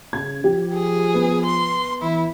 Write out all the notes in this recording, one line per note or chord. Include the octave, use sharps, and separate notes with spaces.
C#3 G#6
F3 G4
G#4
B3
C6
E3 E4